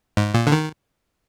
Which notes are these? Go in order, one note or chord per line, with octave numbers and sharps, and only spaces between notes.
G#2
A#2
D3
D#3